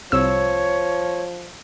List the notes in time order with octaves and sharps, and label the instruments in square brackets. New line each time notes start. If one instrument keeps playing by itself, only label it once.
[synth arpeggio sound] C2 E6 [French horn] F3 [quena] C#5